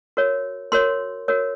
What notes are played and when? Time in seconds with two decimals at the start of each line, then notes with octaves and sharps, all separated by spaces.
0.17 F#4 A#4 C#5
0.72 F#4 A#4 C#5 C6
1.28 F#4 A#4 C#5